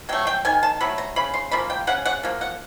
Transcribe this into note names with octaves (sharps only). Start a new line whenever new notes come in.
F#3 A3 G5
G5
D#3 G#5
A5
F#3 A3 B5
A#5
C#3 B5
C6
F3 A#3 B5
G5
C#3 F#5
F#5
F3 A#3
F#5